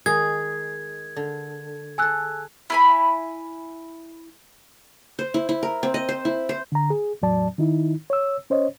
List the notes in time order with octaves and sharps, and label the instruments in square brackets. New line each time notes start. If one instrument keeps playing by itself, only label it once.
[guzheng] D#3 G#3 D#4 [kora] G#4 [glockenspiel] G#6
[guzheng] D3
[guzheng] G#4 A4 [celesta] G#5 E6 F#6
[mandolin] E4 G#5 B5
[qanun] C5
E4
E4
A#4
C4
D#5
C5
E4
C5
[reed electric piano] D3 A#5
G#4
E2 A2 F#3 D5 A5
D#3 D#4 E4
C#5 E6
C#4 C5 C#5 D#5